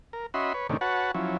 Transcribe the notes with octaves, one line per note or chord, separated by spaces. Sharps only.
A#4
C#4 F#4 D#5 E5 B5 C6
B4 C#5
A2 C3 D#3 C#4 D4
F#4 B4 C#5 F#5 A5
F3 F#3 C#4 E4